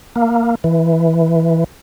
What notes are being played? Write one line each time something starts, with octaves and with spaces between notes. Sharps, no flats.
A#3
E3